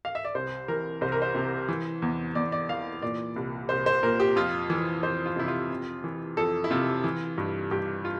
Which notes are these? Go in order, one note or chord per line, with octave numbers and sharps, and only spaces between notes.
F5
E5
D5
C2 C5
E3 A#4
C2 C5
A#4
C5
C3
E3
E2
E2 D5
D5
E3 F5
A#2 D5
C2
C2 C5
C5
A#2 A#4
G4
F2 F4
E3
F2 C5
F4
C3 E4
F4
F2
E3
F2 A4
E4
C3 F4
E3
G2
G2 G4
F4